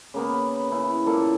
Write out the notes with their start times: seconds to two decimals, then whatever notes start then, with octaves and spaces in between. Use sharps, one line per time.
0.14 C#3 A#3 B3
0.34 B5
0.71 C#3 E4
1.06 A#2 A#3 A4